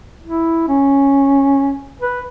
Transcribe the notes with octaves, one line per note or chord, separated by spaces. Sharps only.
E4
C#4
B4